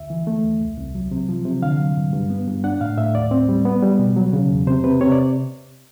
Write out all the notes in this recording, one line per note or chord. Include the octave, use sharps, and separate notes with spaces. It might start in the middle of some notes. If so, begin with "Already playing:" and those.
Already playing: D2 E5
E3
A3
D#2
C2
C2
F#3
C3
F3
C3
D3 F5
F#3
G2
G2
B3
G2
D4 F#5
A2 F5
A2 E5
D#2 D5
C4
G3
B3
G3
B2
F#3
C#3
E2
C3 C5
C3 B4
C3 C#5
D5